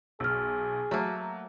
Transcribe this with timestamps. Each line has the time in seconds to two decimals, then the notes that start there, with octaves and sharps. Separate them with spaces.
0.20 B1 G#4 E6 F6
0.91 F#3 A3 A#3